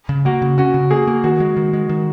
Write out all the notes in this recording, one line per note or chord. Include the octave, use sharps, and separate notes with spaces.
C#3
A#3 F#4
C#3
C#4 F#4
C#3
A#3 G#4
A#3
D#3 F#4
G#3
D#3
G#3
D#3